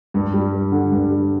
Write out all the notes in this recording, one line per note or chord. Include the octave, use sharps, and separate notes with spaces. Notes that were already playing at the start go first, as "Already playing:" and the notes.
G2
G3
G2
D3
G2
G3